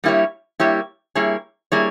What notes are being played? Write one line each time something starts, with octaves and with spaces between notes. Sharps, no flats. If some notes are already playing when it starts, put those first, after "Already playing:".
G3 A#3 E4 G4 C#5
G3 A#3 E4 G4 C#5
G3 A#3 E4 G#4 C#5
G3 A#3 E4 G#4 C#5